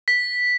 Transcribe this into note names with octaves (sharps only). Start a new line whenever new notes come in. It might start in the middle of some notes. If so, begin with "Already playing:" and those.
B6